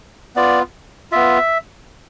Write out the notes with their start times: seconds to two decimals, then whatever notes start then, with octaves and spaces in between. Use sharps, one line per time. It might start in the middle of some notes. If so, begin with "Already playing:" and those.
0.36 B3 F4 D5
1.11 B3 F4 E5